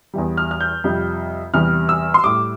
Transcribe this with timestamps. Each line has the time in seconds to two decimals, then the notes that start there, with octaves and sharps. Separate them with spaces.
0.14 E2 E3 G3
0.37 F6
0.51 F6
0.61 G6
0.84 F2 C3 G3
1.53 E2 C3 E3 G3 F6
1.89 E6
2.14 C6
2.23 A2 G3 D6